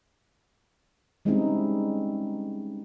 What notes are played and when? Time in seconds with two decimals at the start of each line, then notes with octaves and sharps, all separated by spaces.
1.25 G3 G#3 C4 C#4 D#4 E4